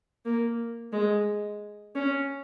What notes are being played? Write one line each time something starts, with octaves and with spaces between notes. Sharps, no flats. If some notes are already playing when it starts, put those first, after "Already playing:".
A#3
G#3
C#4